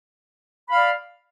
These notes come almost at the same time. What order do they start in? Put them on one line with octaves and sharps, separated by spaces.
B5 F5 D5